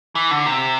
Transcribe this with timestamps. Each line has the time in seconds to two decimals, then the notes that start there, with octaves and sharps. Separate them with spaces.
0.15 E3
0.31 D3
0.46 C3